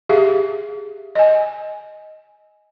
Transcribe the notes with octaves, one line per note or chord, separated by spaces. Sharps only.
G4 G#4 E5 F5
D#5 G#5